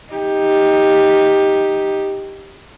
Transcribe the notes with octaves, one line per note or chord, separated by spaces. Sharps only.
D#4 G4